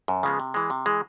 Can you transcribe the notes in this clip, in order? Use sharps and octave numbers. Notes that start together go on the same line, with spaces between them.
F#2
C#3 F3 G#3 B3
C3
E3 G#3
C3
E3 G#3